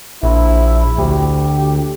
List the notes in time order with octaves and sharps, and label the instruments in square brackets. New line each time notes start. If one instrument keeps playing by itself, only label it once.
[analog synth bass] A#1 [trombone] E4
[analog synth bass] D2 [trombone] G4